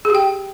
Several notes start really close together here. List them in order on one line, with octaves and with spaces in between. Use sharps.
G#4 G4 G5